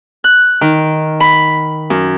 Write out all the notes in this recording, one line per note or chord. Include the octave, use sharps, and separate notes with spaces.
F#6
D#3
B5
F#2